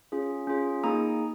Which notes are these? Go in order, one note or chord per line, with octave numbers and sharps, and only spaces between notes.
C#4 F4 G#4
C#4 F4 G#4
A#3 D#4 G#4 A#5 D#6